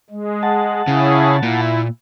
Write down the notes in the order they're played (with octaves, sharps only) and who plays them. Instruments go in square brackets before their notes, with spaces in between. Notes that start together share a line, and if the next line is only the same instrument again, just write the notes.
[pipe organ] G#3
[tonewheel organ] F#5 A5
[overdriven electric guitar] C#3 [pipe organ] C#4 E4 G#4
[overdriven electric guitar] A#2 [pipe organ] E4